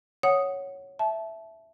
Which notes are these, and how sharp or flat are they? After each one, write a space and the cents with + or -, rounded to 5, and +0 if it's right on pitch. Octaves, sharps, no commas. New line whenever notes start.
C#5 +0 F#5 +0 D#6 +0
E5 +0 A5 -20